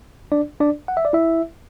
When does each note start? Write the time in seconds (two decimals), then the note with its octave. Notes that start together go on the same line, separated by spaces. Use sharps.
0.32 D4 D5
0.60 D4 D5
0.88 F#5
0.97 E5
1.05 D5
1.13 E4 E5